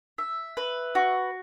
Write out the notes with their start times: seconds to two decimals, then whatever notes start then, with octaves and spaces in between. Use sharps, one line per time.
0.18 E5
0.57 B4
0.95 F#4